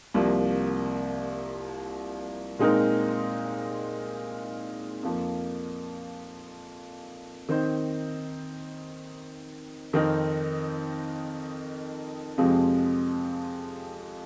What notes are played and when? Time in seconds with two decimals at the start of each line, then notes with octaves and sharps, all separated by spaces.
0.14 C2 C3 F3 A#3
2.59 A#2 G#3 C4 D#4 A#4
5.03 F2 F3 A#3
7.49 D#3 C4 D#4 C5
9.93 F2 D#3 C4 D#4 A#4
12.38 F2 C3 F3 G#3 C4